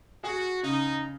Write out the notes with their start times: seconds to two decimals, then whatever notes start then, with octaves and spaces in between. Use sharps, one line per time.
0.24 F#4 G#4
0.63 C#3 D#4